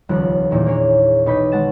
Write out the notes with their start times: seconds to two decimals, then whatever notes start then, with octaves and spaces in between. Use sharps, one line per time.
0.09 D#1 C#2 F3 F#6
0.51 E2 A#2 D#3
0.66 A#3 D4 G#4 C#5
1.26 B1 D#4 B4 B5 C#6 G6
1.52 D#3 G#3 F#5 A5 A6 E7